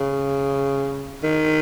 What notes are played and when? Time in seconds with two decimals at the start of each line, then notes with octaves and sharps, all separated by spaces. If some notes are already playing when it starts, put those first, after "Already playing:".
Already playing: C#3
1.23 D#3